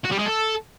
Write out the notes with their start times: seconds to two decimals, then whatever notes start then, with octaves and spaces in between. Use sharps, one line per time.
0.05 F#4
0.12 G3
0.19 G#3
0.26 A4